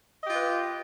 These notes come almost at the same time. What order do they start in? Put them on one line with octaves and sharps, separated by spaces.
D#5 G4 F4 B4